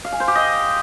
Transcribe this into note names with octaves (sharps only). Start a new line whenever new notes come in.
F5
G#5
C5
G4
D#5